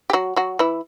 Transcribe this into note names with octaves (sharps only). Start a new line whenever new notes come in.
G4
F#3 F#4
F#3 F#4
E3 E4